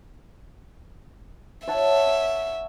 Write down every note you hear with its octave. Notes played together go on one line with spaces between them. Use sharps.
C#5 E5 F#5 A5